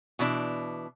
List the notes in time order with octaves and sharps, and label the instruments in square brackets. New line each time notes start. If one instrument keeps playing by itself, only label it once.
[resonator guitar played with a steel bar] B2 E3 D4